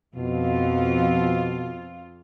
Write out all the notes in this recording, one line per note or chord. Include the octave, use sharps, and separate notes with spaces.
F2 B2 F4